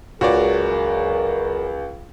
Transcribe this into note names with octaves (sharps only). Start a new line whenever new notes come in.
C#2 F#2 F#4 G#4 A#4 C#5 D5